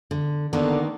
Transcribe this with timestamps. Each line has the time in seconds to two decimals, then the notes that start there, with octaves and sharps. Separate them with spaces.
0.11 D3
0.53 D3 D#3 A#3 B3